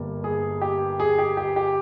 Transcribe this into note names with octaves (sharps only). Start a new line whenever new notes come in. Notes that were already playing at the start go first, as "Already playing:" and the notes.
Already playing: G1 G2 G3 A#3
G#4
G4
G#4
G4
G4
G4